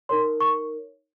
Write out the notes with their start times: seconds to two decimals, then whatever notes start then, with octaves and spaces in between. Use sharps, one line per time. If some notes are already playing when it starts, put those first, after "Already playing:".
0.09 D#4 A#4 C#5 C6
0.40 C#6